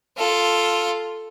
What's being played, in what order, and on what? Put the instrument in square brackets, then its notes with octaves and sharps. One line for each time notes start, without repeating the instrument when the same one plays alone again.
[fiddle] F4 A4